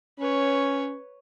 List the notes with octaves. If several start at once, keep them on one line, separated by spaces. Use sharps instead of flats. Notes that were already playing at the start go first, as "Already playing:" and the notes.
C#4 B4 C#5